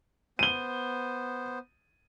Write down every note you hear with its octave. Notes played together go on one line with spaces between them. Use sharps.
B3 C5 D#7 G7